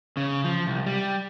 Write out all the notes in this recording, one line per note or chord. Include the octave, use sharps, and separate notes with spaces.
C#3
F3
C2
G3